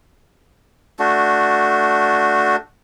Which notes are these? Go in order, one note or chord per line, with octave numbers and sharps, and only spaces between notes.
A3 D4 F#4